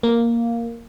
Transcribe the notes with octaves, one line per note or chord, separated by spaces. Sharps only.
A#3